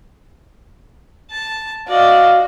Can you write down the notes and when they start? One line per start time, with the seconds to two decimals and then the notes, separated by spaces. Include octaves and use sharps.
1.31 A5
1.88 F#4 D5 D#5 F5